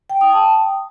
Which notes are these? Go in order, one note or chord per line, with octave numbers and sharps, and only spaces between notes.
G5
D#6
A5